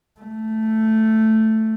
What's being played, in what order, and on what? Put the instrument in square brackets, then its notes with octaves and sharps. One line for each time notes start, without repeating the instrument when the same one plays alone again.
[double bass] A3